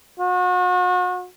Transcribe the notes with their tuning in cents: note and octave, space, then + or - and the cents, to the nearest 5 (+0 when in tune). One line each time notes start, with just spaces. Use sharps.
F#4 -35